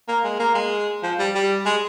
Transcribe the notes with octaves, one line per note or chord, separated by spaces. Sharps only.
A#3
G#3
A#3
G#3
F3
G3
G3
G#3